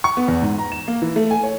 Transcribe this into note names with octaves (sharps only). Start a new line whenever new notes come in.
C#6
B3
E2
G#2
A#5
E7
A#3
E3
A3
G#5
C#5